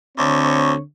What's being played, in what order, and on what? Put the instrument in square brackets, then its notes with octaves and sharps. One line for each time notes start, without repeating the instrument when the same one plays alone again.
[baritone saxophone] D2 [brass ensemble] D3 C4 C#5